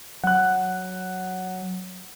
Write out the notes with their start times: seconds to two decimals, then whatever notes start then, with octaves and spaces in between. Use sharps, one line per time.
0.24 F#3 F#5 F#6